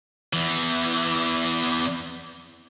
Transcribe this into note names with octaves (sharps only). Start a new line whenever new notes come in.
E2 E3